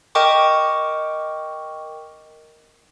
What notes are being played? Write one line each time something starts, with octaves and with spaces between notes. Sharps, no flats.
A#4 D#5 G5 C#6 D6